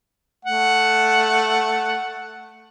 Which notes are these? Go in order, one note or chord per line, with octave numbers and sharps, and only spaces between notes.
A3 F#5